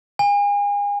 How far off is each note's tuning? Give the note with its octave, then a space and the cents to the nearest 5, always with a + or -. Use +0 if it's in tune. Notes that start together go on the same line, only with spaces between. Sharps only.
G#5 -35